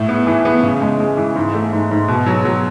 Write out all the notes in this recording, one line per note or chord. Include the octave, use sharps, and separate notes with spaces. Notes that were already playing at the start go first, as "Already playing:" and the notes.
Already playing: A2
B3
E3
B3
C#3
G#3
G#3
E3
G#2
A3
G#2
G#2
B2
F#3
F#3